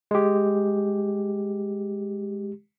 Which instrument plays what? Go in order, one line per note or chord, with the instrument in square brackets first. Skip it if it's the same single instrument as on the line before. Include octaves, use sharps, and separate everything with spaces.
[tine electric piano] G#3 G4